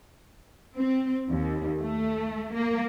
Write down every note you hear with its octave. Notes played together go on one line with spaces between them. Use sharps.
C4
D#2
A3
A#3